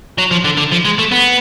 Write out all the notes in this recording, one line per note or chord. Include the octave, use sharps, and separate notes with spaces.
F#3
F3
D3
D3
F3
G#3
A3
B3